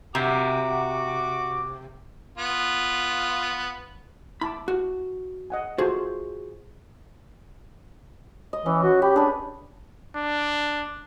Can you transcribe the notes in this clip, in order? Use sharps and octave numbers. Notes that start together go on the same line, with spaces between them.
C3 F#4 E5 F#5 A#5 D6
B3 F4
E4 A5 B5 D6
F#4
D#5 F#5 G#5
F4 F#4 G#4 A4 C5
D#5
E3 C#4
F#4
G4 B5
D4 G#4 B4
D4